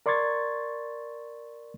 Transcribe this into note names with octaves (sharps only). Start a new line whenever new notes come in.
A#4 D5 C6 C#6 G#6 A6